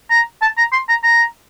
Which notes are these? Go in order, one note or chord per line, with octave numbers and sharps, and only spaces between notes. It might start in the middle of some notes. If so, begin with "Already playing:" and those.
A#5
A5
A#5
C6
A#5
A#5